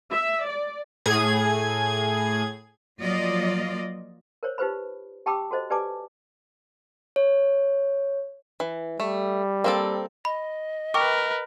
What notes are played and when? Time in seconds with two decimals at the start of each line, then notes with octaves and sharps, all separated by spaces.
0.10 E5
0.46 D5
1.06 A2 G#4 G#6
3.01 F3 F#3 A#3 F4 D5 D#5
4.43 A#4 C5 C#5
4.58 D#4 F4 G4 B4 C5 B5
5.26 G4 G5 A5 B5 D6 E6
5.51 F#4 A4 C5 D#5
5.70 G4 B4 D5 G#5 A5 D6
7.16 C#5
8.60 E3
9.00 G3 A3
9.64 A#3 C4 A4
10.25 D#5 B5
10.94 A#4 B4 G5 C#6 D6